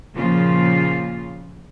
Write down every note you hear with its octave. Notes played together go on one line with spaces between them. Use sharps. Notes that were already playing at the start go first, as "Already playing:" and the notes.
A#2 C#3 F3 F4